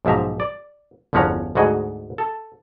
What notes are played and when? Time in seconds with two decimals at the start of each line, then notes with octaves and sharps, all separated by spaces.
0.05 B1 G#2 F3 E5 A#5
0.40 D5
1.13 G1 E2 F3 C#4 F#5 A#5
1.55 D2 G#2 F#4 G#4 D#5
2.18 A4